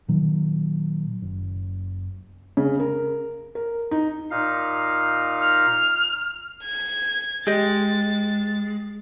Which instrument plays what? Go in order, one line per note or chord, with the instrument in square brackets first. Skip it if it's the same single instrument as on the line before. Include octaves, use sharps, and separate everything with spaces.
[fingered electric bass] A#2 D#3 F#3
F#1
[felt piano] C#3
A#4
A#4
D#4
[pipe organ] A#2 D#4 F5
[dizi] F6
[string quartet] G#6
[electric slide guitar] G#3 [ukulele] G4 D#5 [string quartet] A6